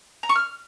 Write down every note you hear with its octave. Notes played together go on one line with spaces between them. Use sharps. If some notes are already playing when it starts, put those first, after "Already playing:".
A#5
C#6
F6